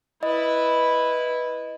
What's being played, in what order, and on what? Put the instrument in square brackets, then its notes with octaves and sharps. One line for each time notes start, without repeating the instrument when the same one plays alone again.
[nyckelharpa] E4 B4 [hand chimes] D#5